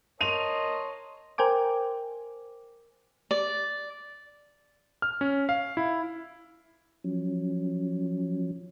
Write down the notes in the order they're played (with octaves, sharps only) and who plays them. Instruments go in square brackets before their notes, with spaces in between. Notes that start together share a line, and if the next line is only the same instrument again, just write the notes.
[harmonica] A#4 C#5 A5 [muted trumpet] D#5 [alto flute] C6 [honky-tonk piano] D#7 F7
[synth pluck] A#4 C5 G5 G#5 D6
[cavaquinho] D5
[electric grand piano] F6
C#4
F5
E4
[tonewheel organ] F3 F#3 C#4